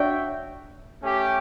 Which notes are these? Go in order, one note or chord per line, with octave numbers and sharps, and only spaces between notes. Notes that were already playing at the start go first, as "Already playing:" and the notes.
Already playing: D4 F#4 C#5 E5 G5
A3 C#4 G4